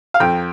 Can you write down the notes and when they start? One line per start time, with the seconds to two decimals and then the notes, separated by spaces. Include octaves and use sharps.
0.14 F5
0.20 F2 G5